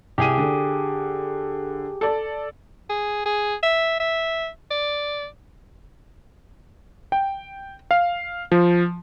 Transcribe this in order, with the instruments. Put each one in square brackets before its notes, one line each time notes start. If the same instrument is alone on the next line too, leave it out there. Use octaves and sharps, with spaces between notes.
[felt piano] C2 D#7 [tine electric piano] G4 G#4
[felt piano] D3
A4 D5
[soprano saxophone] G#4
G#4
E5
E5
D5
[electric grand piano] G5
F5
F3